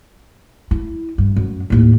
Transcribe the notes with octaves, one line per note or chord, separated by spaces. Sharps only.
E4
G2
F#2
D#2 A2